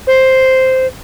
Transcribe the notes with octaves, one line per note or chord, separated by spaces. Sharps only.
C5